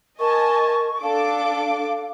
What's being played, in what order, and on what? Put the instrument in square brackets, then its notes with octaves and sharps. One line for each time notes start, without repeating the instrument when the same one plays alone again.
[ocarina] A#4 [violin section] D#5 G#5 A5 [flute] C#6
[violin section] D4 A4 D6 [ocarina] F5 [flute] A5